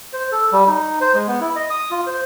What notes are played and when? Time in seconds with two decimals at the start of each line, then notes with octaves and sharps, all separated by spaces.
0.13 C5
0.32 A4
0.52 G3
0.68 D#4
1.01 C5
1.14 G#3
1.27 B3
1.40 E4
1.56 D#5
1.70 D#6
1.91 F4
2.07 C5